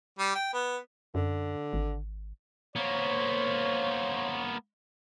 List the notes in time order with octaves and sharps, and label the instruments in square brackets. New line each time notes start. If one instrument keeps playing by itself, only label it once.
[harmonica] G3
G5
B3
[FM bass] F#2 [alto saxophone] D3
[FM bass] G#1
[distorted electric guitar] A#3 B3 [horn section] C5 C#5